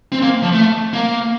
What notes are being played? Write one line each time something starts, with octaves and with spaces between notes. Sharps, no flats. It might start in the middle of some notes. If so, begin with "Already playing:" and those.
C4
A#3
F3
A3
A#3